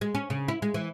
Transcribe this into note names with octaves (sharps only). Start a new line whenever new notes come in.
G#3
C#4
C#3
E4
G#3
E3